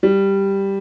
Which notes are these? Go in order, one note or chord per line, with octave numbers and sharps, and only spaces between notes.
G3